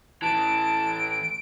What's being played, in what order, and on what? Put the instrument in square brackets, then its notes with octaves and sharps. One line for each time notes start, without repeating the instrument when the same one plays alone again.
[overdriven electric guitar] A2 E3 [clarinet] A5 [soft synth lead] D7